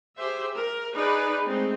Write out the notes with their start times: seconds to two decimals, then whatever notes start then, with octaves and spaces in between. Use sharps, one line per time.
0.18 G4 G#4 C5 E5
0.55 A#4
0.94 D#4 G#4 B4 D5
1.45 G#3 A3 C4 D#4